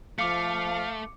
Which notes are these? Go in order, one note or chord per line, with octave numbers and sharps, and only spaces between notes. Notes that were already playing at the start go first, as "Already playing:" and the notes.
F3 A3 F5 D6 C#7